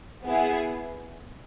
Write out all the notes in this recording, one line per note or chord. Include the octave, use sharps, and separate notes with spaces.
B3 E4 G#4